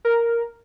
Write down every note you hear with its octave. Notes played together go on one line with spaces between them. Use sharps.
A#4